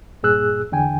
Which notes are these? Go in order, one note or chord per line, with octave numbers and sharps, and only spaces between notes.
G2 A#2 G#4 E6 F#6
E2 D3 G5 G#5